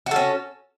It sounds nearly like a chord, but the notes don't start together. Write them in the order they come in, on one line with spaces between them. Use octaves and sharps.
F#4 A4 C#4